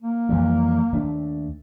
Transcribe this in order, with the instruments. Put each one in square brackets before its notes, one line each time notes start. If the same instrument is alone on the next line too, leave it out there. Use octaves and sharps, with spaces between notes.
[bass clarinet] A#3
[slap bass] F2 E3 G3
D#2 A3 D4